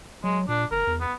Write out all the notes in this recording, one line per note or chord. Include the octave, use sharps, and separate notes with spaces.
F#3 G#3
A#2 D4
F#1 A#4
E2
B3